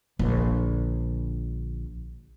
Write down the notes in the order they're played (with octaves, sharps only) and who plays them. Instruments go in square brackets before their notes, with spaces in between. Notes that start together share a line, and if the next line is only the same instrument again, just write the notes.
[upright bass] A#1 D3